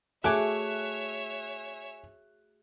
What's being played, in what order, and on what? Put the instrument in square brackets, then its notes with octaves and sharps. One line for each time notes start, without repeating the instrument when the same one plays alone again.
[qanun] A3 D6 [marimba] F#4 G#4 [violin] C#5 E5 [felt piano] G#5 F#6